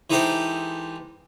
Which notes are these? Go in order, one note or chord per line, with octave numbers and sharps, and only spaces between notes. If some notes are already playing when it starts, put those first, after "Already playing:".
E3 G#3 D#4 G4 A4 C5